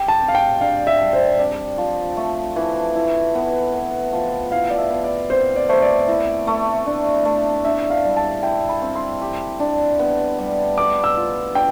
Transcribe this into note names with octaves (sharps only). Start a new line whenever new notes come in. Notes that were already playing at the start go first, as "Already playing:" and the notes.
Already playing: G4 G5
A5
C4
F5
G5
D4 F5
E5
G3
C5
C4 D5
F3
A3
E3
E4
B3
B3
F3
E4 F5
D5
E5
B3
D5
C4 C5
D5
A3 C5
D5
E4
A3
D4
A3
D4 E5
F5
G3
A5
E4 G5
B5
C4
C6
G4
D4
B3
G3
B4 D6
E6
F4
D4 G5